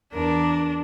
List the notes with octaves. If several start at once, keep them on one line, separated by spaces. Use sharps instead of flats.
E2 D4 A#4